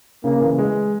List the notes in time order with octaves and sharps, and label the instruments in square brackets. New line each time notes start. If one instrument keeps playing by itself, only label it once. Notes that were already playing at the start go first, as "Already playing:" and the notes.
[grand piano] C#3 [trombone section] A#3
[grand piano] E3
G#3